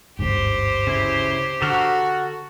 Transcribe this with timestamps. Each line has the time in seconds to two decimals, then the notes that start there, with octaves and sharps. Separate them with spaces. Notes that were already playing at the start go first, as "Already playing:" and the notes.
0.19 G1 D2 G#2 G4 C5
0.87 C#3 E4
1.62 D3 F#4 A4 A#5 F6